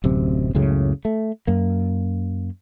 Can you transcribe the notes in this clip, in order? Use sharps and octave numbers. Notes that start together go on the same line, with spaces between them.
D1 F#2 C3
C#2 F#2 A2 C#3
A3
F#2 A#3